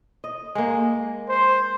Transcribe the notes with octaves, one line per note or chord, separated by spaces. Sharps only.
D#5
G#3 A#3
C5